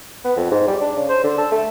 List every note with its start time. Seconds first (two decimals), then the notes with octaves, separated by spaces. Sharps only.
0.24 B3
0.36 F2
0.51 G#2
0.68 G3
0.81 D4
0.96 C#3
1.09 C5
1.24 D3
1.38 A4
1.52 A3